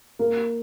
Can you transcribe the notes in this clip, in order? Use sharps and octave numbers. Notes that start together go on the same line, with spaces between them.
A#3